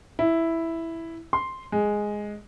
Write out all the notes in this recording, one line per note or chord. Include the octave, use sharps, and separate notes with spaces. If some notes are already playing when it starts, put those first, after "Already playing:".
E4
C6
G#3